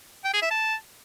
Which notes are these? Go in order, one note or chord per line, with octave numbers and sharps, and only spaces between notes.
G5
G#4
E5
A5